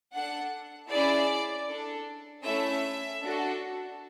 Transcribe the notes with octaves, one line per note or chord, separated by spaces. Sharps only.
D4 A4 F#5
C#4 E4 G#4 D5
D4 A4
A3 C#4 E4 A4 E5
D4 F#4 A4